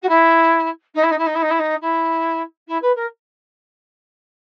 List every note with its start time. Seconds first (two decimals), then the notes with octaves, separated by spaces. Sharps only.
0.02 F#4
0.08 E4
0.94 D#4
1.03 E4
1.10 D#4
1.18 E4
1.26 D#4
1.34 E4
1.42 D#4
1.50 E4
1.59 D#4
1.81 E4
2.67 E4
2.82 B4
2.95 A#4